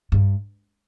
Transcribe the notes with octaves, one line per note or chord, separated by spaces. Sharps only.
G2